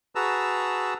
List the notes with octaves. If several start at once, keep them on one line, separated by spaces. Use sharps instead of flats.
F#4 G#4 B4 A5 A#5 E6